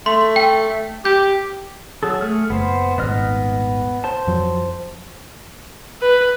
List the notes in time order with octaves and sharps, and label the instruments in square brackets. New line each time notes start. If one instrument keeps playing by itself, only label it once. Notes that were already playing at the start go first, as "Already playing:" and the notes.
[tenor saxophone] A3 [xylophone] C6
[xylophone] G5
[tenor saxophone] G4 [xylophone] G6
[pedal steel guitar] F#3 G#4 A4
A3 G#4 F6
[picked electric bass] F#1 [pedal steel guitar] B3 C5
[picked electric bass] D#1 G#1 G#2 [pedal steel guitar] B3 D#5 F6
[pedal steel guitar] C5 A5
[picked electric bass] F2 F3 F#3
[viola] B4